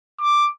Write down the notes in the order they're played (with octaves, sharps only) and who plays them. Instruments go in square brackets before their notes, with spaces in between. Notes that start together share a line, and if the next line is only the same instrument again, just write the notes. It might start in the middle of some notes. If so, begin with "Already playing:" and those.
[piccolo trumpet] D6